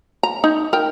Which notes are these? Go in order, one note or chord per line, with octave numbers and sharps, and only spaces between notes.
A#5
D#4 D#5
A#4 G5